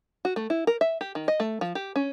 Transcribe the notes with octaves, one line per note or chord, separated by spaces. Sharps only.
F#4
A3
E4
A#4
E5
G4
D#3
D#5
A3
F3
G4
C#4